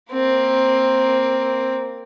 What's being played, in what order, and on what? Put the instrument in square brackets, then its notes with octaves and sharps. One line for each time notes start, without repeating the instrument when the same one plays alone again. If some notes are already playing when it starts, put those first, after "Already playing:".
[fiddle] A#3 C4